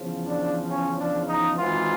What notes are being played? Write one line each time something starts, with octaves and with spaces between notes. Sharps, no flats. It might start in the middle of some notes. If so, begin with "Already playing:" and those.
Already playing: E2 C#3 F3
D4
C#4
D4
D#4
G#1 G#2 E3 F4